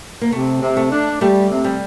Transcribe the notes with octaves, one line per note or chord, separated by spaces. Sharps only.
A#3
C3 A3
C3
A3
D4
G3 A3
C3
G3